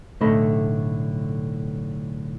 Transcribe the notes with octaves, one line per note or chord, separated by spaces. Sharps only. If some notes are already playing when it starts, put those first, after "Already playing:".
B1 A2 D3 A3 D#5 B5